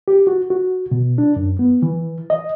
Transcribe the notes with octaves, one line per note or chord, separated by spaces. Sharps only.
G4
F#4
F#4
B2
D4
F#2
B3
E3
D#5